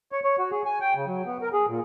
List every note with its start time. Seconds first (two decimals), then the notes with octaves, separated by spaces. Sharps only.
0.12 C#5
0.24 C#5
0.39 F#4
0.52 G#4
0.66 G#5
0.81 G5
0.95 C#3
1.07 F#3
1.26 B3
1.42 A#4
1.53 G#4
1.68 A#2